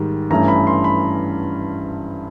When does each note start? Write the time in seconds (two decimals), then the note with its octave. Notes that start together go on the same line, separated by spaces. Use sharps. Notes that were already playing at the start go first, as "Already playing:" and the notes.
Already playing: G#2 D#3 G3
0.30 G2 E3 A3 C#4 A#5
0.48 B5
0.67 C6
0.84 B5